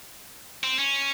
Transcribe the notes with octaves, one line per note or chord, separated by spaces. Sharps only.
C4
C#4